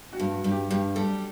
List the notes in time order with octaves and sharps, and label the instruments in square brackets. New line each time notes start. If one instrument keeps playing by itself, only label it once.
[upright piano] F#4
[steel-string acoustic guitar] G2
[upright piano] F#4
[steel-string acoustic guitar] G2
[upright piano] G4
[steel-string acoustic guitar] G2 [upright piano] G4
[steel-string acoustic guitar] G3 [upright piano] A3 A4